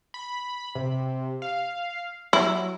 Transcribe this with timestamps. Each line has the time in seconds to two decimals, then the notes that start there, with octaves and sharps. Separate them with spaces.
0.14 B5
0.75 C3
1.42 F5
2.33 F#3 E4